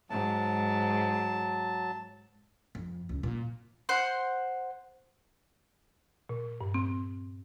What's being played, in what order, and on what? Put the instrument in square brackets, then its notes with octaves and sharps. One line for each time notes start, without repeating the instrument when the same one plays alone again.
[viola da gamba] G#2 [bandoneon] F#3 A5
[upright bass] F2
C#2
A#2
[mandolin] C5 F#5 C6
[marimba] A#2
G2
C4